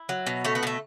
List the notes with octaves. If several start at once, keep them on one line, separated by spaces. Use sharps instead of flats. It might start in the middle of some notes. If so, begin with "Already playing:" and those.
Already playing: E4
F#3
B2
A3 C#4
B3
B2 A3